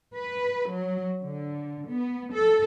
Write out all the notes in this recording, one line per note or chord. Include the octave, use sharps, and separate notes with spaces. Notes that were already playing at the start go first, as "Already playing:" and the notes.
B4
F#3
D3
B3
A4